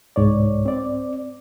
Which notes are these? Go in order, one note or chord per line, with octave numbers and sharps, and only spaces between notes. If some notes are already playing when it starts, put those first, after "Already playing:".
C2 G#2 C#5 D5
C4 D5